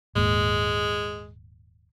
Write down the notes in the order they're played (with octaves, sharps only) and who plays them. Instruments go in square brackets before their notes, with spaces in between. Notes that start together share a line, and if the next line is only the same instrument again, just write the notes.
[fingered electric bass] D#1 G#2 A#3 [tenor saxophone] G#3